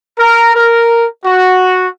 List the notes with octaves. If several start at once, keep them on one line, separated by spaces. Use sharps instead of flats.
A#4
A#4
F#4